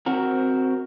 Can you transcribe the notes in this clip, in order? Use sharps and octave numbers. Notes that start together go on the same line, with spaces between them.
C4 F#4 A#4